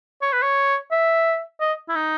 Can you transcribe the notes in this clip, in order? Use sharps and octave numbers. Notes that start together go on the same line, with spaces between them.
C#5
B4
C#5
E5
D#5
E4
D#4